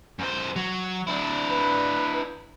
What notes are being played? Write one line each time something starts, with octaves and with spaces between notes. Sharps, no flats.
F#2 C5
F#3
D4 E4
B4